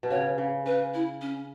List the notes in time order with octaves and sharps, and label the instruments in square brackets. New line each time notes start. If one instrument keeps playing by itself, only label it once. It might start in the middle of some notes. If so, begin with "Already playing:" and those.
[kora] B2
[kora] C#3 [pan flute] C#5
[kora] C#3
[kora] C#3 [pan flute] B4
[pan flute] E4
C#4